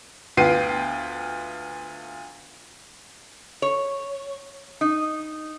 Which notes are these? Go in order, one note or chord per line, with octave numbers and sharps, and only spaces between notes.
D2 B3 F4 G5 C7 D#7
C#5
D#4